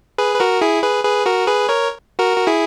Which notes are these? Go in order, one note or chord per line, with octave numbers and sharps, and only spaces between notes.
G#4 B4
B4
F#4 A#4
E4 G#4
G#4 B4
G#4 B4
F#4 A#4
G#4 B4
A#4 C#5
F#4 A#4
F#4
E4 G#4